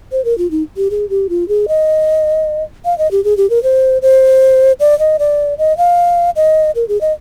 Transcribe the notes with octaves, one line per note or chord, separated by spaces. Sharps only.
C5
A#4
F4
D#4
G4
G#4
G4
F4
G#4
D#5
F5
D#5
G4
G#4
G4
A#4
C5
C5
D5
D#5
D5
D#5
F5
D#5
A#4
G#4
D#5